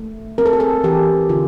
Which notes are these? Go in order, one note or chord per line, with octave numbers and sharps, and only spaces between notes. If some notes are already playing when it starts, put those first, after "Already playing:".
Already playing: A3
C4 A#4
A4
G#4
A4
E3 G4
D3 F4